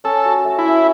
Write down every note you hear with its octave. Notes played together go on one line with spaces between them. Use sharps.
C#4 A4
F#4
A3
E4
C#4